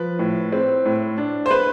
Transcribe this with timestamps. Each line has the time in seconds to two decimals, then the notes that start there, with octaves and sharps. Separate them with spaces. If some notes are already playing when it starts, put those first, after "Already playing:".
Already playing: F3 B4
0.19 A2
0.52 C4
0.86 A2
1.18 D4
1.46 C5
1.51 B4